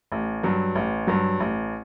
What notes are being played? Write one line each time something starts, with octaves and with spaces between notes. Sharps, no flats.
A1
G2 F#3
A1
G2 F#3
A1